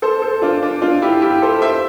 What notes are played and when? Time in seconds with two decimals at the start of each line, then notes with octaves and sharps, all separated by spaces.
0.02 A4 C5
0.22 A4 C5
0.42 D4 F4
0.62 D4
0.82 D4 F4
1.02 E4 G4
1.22 E4 G4
1.42 A4 C5
1.62 C5 E5